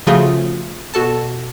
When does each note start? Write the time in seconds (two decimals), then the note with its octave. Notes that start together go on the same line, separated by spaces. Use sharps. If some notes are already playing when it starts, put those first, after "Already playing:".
0.07 C#3 F3 A3 F4 F#4 G#4
0.94 B2 F#4 A4 A5